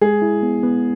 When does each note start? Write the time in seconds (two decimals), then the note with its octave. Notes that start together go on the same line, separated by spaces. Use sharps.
0.01 G#3 G#4
0.22 E4
0.43 B3
0.63 B3